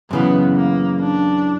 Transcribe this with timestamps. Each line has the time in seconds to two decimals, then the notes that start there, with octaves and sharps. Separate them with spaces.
0.11 F#2 C#3 E3 B3
0.56 A#3
1.00 D4